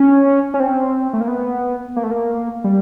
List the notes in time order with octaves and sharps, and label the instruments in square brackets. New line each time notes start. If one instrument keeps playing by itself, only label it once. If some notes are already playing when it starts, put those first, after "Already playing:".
Already playing: [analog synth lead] C#4
C#4
C4
A3
A#3
B3
A#3
A3
A#3
G3